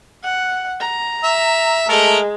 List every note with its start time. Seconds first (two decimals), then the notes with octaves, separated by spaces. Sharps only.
0.24 F#5
0.80 A#5
1.24 E5
1.89 G#3 A3 A4 A#4